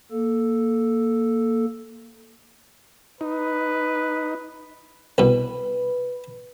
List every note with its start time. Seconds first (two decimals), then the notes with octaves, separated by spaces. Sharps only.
0.12 A#3 A4
3.21 D#4 B4
5.18 C2 B2 B4